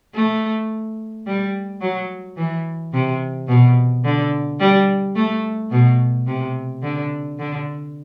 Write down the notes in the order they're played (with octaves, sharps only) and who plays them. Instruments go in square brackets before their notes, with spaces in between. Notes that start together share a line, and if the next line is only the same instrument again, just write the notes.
[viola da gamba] A3
G3
F#3
E3
C3
B2
D3
G3
A3
B2
C3
D3
D3